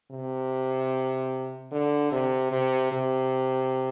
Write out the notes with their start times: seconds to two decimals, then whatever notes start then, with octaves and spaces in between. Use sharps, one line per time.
0.11 C3
1.72 D3
2.12 C3
2.52 C3
2.92 C3